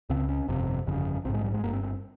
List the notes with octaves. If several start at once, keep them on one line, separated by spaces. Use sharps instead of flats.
C#2 C#3 C4
C#4
G1 F2 C3
G1 F2 C#3
A#1 C4
G#2 G#3
G3
G#3
G1 G2 A#3
C4
C4